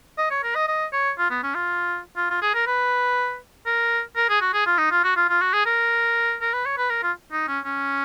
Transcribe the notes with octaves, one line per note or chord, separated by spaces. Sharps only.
D#5
C#5
A#4
D#5
D#5
C#5
F4
B3
C#4
F4
F4
F4
G#4
A#4
B4
A#4
A#4
G#4
F#4
G#4
F4
D#4
F4
F#4
F4
F4
F#4
G#4
A#4
A#4
B4
C#5
B4
A#4
F4
D#4
C#4
C#4